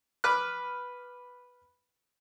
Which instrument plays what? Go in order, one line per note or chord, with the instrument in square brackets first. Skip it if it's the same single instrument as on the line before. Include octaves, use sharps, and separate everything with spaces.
[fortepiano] B4 D6 F6 F#6